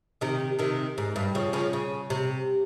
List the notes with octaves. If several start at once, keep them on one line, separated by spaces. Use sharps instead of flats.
C3 D#3
C3 D#3
G#2
G2
C#3 F3
C#3 F3
C#3
C3